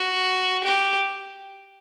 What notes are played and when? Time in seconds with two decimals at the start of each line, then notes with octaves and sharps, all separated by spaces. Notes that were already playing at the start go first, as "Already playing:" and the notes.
Already playing: F#4
0.64 G4